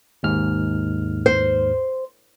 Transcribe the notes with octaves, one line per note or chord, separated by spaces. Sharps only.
D#2 G#2 F6
C5